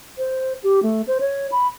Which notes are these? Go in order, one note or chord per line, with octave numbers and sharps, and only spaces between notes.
C5
G4
A3
C5
C#5
B5